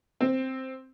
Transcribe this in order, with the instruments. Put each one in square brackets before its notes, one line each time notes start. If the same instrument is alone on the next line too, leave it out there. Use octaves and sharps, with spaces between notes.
[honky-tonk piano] C4